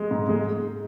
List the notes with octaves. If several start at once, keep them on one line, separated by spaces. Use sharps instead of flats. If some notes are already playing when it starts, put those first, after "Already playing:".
Already playing: G#3
G#2
G#3